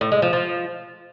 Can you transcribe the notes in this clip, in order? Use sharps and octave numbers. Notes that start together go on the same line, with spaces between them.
A2
G#3
F3
F3